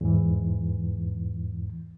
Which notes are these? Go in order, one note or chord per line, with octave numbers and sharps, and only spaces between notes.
E2 G#2 E3